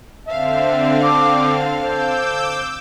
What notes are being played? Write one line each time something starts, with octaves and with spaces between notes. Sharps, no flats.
D3 C4 E5 F5 A5
A4 D6
C5 D6 E6 G6